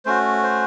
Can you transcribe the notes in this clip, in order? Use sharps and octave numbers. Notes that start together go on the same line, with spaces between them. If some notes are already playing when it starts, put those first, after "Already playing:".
A3 C#4 F#4 C5
C5